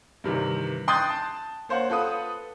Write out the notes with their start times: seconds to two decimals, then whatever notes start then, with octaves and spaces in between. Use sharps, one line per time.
0.24 G2 C3 D#3 E3
0.88 G5 C6 D#6 F#6 G6 A6
1.10 A5
1.69 A#3 C5 C#5 F#5
1.90 F4 A4 B4 D#6